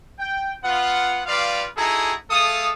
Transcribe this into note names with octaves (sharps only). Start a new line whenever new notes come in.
G5
B3 F4 F#5
G3 F4 B4 D5 F5
D#4 E4 F#4 G#4 A4 A#5
A3 G#4 A4 F5 D#6